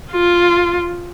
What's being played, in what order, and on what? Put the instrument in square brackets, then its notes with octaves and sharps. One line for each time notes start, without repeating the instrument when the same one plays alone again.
[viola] F4